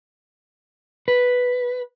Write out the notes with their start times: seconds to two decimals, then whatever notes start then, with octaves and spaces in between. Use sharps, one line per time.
1.08 B4